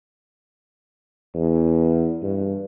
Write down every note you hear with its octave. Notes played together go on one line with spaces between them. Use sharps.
E2
G2